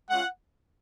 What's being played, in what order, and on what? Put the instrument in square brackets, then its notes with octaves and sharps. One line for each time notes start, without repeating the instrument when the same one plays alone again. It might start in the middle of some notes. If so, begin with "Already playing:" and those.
[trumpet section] G#3 C#4 F4 F#5